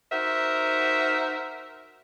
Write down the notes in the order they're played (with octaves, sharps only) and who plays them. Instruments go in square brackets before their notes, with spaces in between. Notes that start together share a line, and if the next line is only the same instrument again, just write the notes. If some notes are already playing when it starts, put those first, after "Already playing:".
[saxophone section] D#4 F#4 A#4 C5 E5